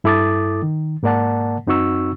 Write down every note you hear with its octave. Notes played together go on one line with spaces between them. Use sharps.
G2 E4 A4 D6 D#6 A6
D#3
G#2 A#3 A#4 D5 F#5 A5
F#2 C4 D#4 F#4 C#6 E6